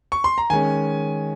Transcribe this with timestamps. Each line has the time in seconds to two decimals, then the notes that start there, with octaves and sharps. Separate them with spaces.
0.12 C#6
0.24 C6
0.38 A#5
0.50 D#3 G#3 C#4 G#5